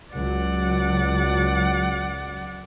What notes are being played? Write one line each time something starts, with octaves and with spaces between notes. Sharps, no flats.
C#2 F#3 D5 F#5